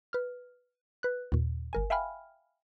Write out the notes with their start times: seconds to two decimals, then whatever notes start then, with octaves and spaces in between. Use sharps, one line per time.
0.13 B4 F6
1.03 B4 F#6
1.32 D#2 A#2
1.73 G1 A#4 G#5
1.90 E5 F5 G5 G#5 B5 F6